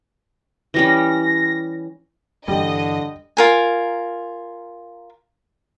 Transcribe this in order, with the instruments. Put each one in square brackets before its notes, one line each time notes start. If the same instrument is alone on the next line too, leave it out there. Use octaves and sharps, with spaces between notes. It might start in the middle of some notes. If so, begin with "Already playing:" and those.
[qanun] E3 G3 C#4 [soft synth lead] A#6
[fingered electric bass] G2 E3 [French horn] D3 [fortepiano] G3 [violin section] D#5
[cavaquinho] F4 A#4 G#5